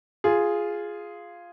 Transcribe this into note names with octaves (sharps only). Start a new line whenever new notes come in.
F4 G#4